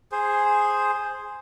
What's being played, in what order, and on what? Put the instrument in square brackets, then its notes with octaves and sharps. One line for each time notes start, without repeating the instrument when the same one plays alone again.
[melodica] G#4 C5